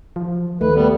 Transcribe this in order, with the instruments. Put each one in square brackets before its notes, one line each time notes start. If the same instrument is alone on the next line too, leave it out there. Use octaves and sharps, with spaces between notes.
[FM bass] F3
[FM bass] D#2 [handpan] A3 [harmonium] B4
[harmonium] G3 B3